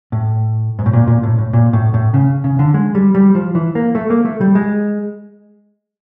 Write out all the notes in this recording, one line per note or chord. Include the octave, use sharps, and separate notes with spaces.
A2
G#2
A2
A#2
A#2
A2
A2
A#2
A2
A2
C#3
C#3
D3
G#3
G3
G3
F3
E3
A#3
A3
A#3
A3
G3
G#3